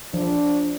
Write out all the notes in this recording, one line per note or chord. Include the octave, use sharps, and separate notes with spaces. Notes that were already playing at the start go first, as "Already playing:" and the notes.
F3 D4